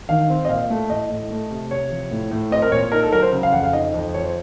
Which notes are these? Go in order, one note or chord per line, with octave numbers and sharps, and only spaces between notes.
D#3 F5
C4
D#5
A#2 F5
A3
A2 D#5
A2
A3
C3
C3 C#5
F3
A2
A2
C4 D#5
A#4
A#2 C#5
D#4 A#4
A4
F#3 A#4
C5
C#3
F5
F2 F#5
F5
D#4 D#5
F2
F3 C#5
C5